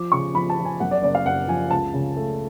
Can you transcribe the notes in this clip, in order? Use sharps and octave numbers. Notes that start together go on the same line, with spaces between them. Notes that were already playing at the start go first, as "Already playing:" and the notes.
Already playing: F3 D6
C#3 C#6
F3 B5
A5
F3
G#5
F#2 F#5
D5
F#1 D5
F5
F#1 F#5
F3 G#5
C#2 A5
C#3
A3